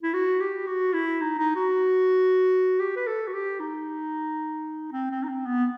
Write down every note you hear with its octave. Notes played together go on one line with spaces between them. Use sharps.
E4
F#4
G4
F#4
E4
D#4
D#4
F#4
G4
B4
A4
F#4
G4
D#4
C4
C4
D#4
C4
B3